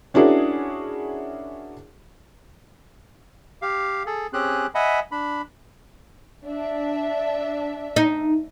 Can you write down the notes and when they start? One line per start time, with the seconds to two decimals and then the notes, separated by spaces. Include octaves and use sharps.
0.14 C#4 D4 E4 F#4 G#4 A#4
3.62 G4 F5
4.06 G#4 A4
4.33 C4 C#4 G4 G#4 F#6
4.75 D#5 E5 F#5 G#5 B5
5.12 D4 B5
6.45 D4 E5
7.96 D#4